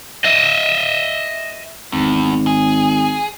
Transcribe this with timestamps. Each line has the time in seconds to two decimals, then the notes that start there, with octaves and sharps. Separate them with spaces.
0.24 D#5 E5
1.92 G#1 E2
2.47 G#4